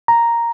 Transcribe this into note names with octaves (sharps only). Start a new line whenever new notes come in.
A#5